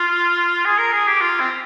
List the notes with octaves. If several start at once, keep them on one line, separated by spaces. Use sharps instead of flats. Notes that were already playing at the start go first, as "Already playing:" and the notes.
Already playing: F4
G#4
A#4
G#4
G4
F4
C4